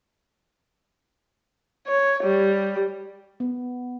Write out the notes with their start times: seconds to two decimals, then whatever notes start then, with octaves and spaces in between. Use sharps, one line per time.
1.87 C#5
2.23 G3
3.40 B3